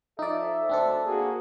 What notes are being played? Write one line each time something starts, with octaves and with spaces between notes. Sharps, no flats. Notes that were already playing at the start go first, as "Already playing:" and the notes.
F3 D#4 A4 D5 E5
D2 C4 D4 A4
A#3 F#4 G#4